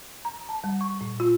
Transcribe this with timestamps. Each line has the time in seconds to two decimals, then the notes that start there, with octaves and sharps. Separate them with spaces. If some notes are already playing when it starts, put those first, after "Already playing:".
0.25 A#5
0.49 A5
0.64 G3
0.81 C#6
1.01 A#2
1.20 F4